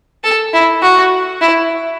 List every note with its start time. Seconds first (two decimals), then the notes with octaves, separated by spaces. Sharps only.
0.24 A4
0.53 E4
0.82 F#4
1.41 E4